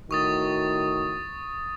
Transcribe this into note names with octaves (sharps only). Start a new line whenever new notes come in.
A2 D#3 F#4 C#6 D#6 A6